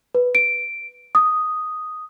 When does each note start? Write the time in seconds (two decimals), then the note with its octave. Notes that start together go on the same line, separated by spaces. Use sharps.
0.15 B4
0.35 D7
1.15 D#6